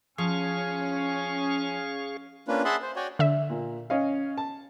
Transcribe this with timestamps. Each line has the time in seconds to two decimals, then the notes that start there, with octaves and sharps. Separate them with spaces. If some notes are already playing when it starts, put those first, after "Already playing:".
0.18 F3 C#4 G#4 F5 G#5 C#6 F6
2.48 A#3 C#4 D4 F4 B4
2.65 G#4 E5 F#5 A5 B5 C6
2.82 C5
2.96 F#4 C#5 D5 G5 G#5
3.19 D3 E5
3.50 A#2
3.90 C#4 D#5 F5
4.38 A5